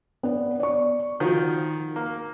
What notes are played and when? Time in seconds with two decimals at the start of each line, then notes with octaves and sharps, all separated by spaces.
0.23 B3 D5
0.60 D5 C#6
1.20 D#3 F3 F#4
1.96 A#3